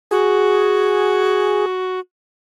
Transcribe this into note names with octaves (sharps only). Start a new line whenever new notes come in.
F#4 G#4